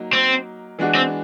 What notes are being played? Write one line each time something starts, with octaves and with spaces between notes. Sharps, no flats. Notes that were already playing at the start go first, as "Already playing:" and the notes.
Already playing: F#3 A#3 D#4
C4
E3 G#3 B3 D4 F#4
C4